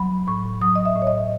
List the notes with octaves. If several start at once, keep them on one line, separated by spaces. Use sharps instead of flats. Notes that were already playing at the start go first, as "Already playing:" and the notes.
Already playing: F#3 B5
A2 C#6
F#3 D#6
D#5
E5
A2
C#5
D#5